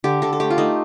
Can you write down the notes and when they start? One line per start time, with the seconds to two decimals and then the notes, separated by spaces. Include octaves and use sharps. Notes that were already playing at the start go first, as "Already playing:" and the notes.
0.04 D3 G4
0.22 D3 A4
0.33 A4
0.40 A3 G4
0.50 F4
0.58 A3 D#4